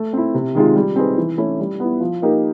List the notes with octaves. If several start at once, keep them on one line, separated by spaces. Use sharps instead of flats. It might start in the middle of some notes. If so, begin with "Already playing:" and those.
Already playing: A3
C4 E4
C3
D#3 G#3 C4 F4
G3
C4 D#4 G#4 B4
E3
A3 C#4 E4
G3
B3 E4
F3
A#3 D#4 G4 A#4